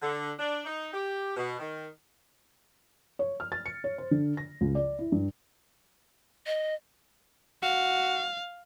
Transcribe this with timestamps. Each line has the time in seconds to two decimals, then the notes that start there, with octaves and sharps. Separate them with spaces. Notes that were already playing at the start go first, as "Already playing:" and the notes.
0.02 D3
0.39 D4
0.66 D#4
0.94 G4
1.37 B2
1.60 D#3
3.19 C#5
3.40 F6
3.52 A6
3.66 C#7
3.84 C#5
3.98 C5
4.11 D3
4.37 A#6
4.61 C#2
4.75 D5
4.99 E4
5.12 G2
6.46 D#5
7.63 F#4 F5